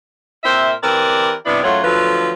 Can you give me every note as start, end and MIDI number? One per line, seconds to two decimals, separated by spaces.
0.44 0.72 46
0.44 0.72 60
0.44 0.72 70
0.44 0.72 72
0.44 0.72 76
0.83 1.34 52
0.83 1.34 60
0.83 1.34 67
0.83 1.34 70
0.83 1.34 71
0.83 1.34 74
1.46 1.63 43
1.46 1.63 48
1.46 1.63 59
1.46 1.63 62
1.46 1.63 64
1.64 1.81 42
1.64 1.81 54
1.64 1.81 57
1.64 1.81 65
1.64 1.81 73
1.64 1.81 78
1.84 2.32 38
1.84 2.32 53
1.84 2.32 54
1.84 2.32 69
1.84 2.32 71